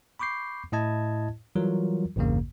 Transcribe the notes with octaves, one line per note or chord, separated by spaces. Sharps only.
B5 C#6 D6 G6 C7
A2 E4 D#5 A5 G#6
E3 F#3 G3 F4 A#4
A1 E2 G2 C#3 A#3